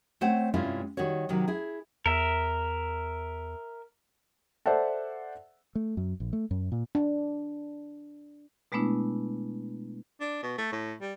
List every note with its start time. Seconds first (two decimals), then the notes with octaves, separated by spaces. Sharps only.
0.21 A3 C4 C5 C#5 F#5
0.54 G2 C3 G#3 C#4 E4 F4
0.97 D#3 G3 F#4 C#5
1.29 C3 D#3 F#3
1.48 E4 G#4
2.06 E2 A#4 E5
4.66 A4 C5 D5 E5 F#5 A5
5.75 A3
5.97 F#2
6.20 A#1
6.33 A3
6.51 F#2
6.72 A#2
6.95 D4
8.72 B2 G#3 A3 B3 D4 E4
10.21 D4
10.43 B2
10.58 A3
10.72 A2
11.01 G3